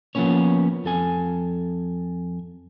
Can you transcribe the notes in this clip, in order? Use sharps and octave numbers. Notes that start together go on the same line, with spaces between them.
F3 A#3 B3 C#4 C#5
F2 A4 G#5